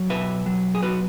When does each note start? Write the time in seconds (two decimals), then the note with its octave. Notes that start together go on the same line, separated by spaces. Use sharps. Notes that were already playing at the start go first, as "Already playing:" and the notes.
Already playing: F#3
0.10 B2 B4 E5
0.46 F#3
0.75 G#4
0.82 B2 F#4 B4